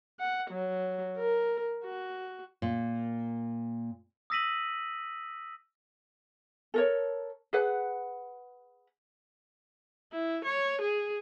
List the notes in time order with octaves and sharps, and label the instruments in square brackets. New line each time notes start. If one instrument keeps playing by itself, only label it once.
[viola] F#5
F#3
A#4
F#4
[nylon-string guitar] A#2
[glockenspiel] D#6 E6 A#6 B6 D#7 F#7
[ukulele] A4 A#4 C#5
G#4 B4 F#5
[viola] E4
C#5
G#4